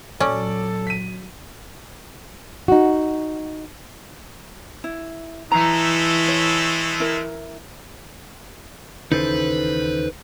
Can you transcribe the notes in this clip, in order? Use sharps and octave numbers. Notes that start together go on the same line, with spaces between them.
A#2 F#3 C#4 A4 D5
B6 D#7
D#4 F#4
E4
E3 G#3 A3 A#5
C#5
E4 A#4
D#2 C#3 E3 D#4 A4 B4 C5